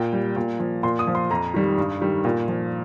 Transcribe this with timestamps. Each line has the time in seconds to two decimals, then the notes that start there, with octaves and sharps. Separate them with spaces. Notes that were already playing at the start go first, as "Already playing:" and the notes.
Already playing: A#2 G5
0.13 G3
0.36 A#2
0.59 F3
0.83 A#2 C6
0.99 D#6
1.07 F3
1.15 C6
1.30 F2 A#5
1.54 D#3 G3
1.78 G2
2.01 D#3 G3
2.25 A#2
2.48 F3